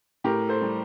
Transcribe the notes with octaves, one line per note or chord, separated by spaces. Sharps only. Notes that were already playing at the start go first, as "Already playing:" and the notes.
A2 G4 A#4
A4 C5
G3